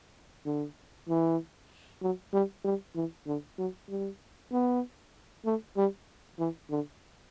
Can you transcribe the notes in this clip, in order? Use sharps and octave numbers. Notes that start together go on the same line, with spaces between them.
D3
E3
F#3
G3
G3
E3
D3
F#3
G3
B3
A3
G3
E3
D3